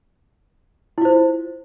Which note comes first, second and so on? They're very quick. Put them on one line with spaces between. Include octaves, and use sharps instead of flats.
E4 F4 C5